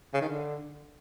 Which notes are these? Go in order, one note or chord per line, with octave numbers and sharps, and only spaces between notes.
C#3
D#3
D3